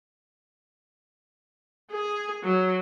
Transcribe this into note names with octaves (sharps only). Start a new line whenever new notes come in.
G#4
F#3